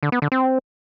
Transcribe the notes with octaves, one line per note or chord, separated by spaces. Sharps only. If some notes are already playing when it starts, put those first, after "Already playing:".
D3
B3
D3
C4